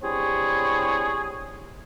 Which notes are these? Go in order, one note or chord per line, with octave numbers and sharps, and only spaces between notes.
C4 D4 E4 G4 G#4 C#5